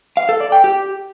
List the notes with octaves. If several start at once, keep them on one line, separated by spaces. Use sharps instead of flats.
F5
A4
D5
G5
G4